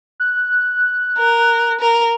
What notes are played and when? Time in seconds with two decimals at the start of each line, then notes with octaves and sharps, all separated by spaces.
0.20 F#6
1.18 A#4
1.81 A#4